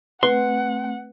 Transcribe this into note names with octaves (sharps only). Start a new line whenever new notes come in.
A3 C4 B4 F#5 C6